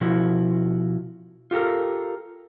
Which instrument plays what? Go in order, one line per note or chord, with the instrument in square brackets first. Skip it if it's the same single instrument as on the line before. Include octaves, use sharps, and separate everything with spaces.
[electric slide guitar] B2 F3 E4 F#4
F4 G4 A4 A#4